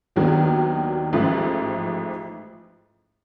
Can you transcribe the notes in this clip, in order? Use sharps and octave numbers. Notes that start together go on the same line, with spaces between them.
D#2 D#3 F#3 B3 D4
A1 G#2 F3 A3